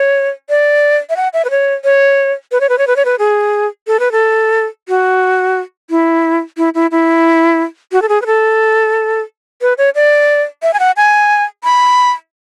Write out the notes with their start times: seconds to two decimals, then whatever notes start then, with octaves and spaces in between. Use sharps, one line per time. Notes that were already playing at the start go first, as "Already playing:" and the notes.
Already playing: C#5
0.50 D5
1.10 E5
1.17 F#5
1.33 E5
1.45 B4
1.50 C#5
1.84 C#5
2.52 B4
2.61 C#5
2.69 B4
2.78 C#5
2.87 B4
2.96 C#5
3.05 B4
3.19 G#4
3.87 A4
4.00 B4
4.12 A4
4.89 F#4
5.90 E4
6.57 E4
6.75 E4
6.91 E4
7.92 F#4
8.02 A4
8.09 G#4
8.22 B4
8.26 A4
9.62 B4
9.78 C#5
9.95 D5
10.63 E5
10.74 G#5
10.80 F#5
10.97 G#5
11.64 B5